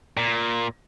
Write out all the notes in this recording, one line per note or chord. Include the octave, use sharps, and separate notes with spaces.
A#2